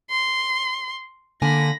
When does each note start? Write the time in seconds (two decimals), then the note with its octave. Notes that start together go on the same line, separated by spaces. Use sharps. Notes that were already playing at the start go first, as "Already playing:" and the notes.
0.10 C6
1.42 D3 A#3 G#5 B5 A#6